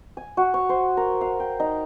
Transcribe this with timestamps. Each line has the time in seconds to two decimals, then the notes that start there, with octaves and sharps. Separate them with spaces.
0.17 G#5
0.37 F#4
0.54 C#5
0.69 C5
0.97 A#4
1.21 F5
1.40 G5
1.60 D#4